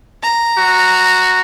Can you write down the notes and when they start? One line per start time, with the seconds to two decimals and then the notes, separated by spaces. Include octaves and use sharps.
0.23 A#5
0.58 F#4